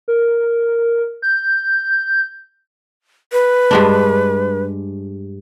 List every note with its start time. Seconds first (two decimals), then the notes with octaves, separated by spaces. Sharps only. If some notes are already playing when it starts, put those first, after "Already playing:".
0.08 A#4
1.22 G6
3.32 B4
3.71 G2 G#3 D4